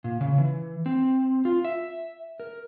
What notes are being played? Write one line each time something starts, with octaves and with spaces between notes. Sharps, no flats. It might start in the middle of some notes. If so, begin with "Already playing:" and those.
A#2
C#3
E3
C4
F4
E5
A#4